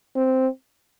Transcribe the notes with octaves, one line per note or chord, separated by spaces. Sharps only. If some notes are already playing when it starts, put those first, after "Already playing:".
C4